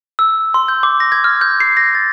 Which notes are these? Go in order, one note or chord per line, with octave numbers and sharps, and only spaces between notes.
E6
C6
G6
D6
A#6
G#6
F6
G6
C7
A#6
A6